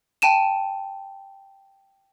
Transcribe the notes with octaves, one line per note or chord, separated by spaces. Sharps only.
G5 A5 D#7 E7